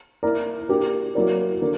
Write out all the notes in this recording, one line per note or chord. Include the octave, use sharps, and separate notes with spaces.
A#3 E4 A#4 D5
A#3 D4 G4
F#3 A#3 E4 A#4 D5
D3 A#3 D4